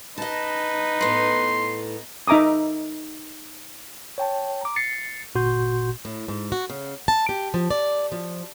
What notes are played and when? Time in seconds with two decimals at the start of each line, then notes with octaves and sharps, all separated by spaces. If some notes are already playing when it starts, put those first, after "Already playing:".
0.18 D#4 B4 D#5 A5
1.01 A2 B3 C6
2.28 D#4 E5 A#5 D6 D#6
4.18 C#5 G5 A5
4.61 A#5 D6
4.76 A6 C7 C#7
5.35 G1 A#2 F#4 C6 G6
6.05 A2
6.28 G#2
6.52 F#4
6.70 C#3
7.08 A5
7.29 G4
7.54 F3
7.71 D5
8.12 F3